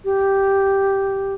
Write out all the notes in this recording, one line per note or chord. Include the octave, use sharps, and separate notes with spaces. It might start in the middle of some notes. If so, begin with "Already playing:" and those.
G4